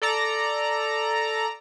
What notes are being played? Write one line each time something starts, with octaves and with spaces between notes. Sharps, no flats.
A4 D5 A#5